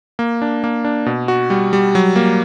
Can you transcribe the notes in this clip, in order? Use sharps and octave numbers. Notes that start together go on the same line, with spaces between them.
A#3
D4
A#3
D4
B2
F#4
G3
G3
F#3
A#3